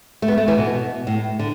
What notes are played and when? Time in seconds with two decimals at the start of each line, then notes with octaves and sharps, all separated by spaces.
0.22 A3
0.28 B3
0.38 A3
0.48 E3
0.58 B2
1.07 A2
1.39 D3